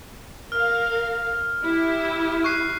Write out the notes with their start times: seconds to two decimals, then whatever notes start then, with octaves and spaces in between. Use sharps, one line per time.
0.52 A#4 F5 F6
1.64 E4 G4
2.44 C#6 F#6 C7